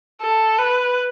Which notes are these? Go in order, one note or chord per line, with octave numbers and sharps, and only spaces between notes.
A4
B4